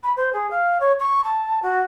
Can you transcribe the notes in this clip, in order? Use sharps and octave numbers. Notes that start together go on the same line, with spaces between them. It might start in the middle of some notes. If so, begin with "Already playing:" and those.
B5
C5
G#4
F5
C#5
C#6
A5
F#4